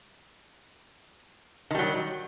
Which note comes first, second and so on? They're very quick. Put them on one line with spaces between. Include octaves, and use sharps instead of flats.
D#3 G3 F#3